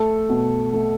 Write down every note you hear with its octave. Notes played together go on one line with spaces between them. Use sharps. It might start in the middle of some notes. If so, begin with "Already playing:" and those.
Already playing: A3 A4
B2
A3